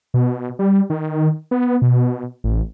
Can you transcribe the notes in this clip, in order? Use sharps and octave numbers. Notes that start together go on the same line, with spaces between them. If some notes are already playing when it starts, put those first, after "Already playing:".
B2
G3
D#3
B3
B2
A1